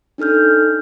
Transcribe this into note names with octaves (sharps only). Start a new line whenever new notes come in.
D4 D#4 A4 F6 G6